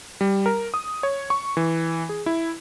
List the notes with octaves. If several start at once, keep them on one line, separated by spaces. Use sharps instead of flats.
G3
A#4
D#6
C#5
C#6
E3
G#4
E4